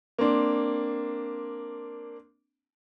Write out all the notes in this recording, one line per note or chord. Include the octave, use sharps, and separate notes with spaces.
A#3 C4 D4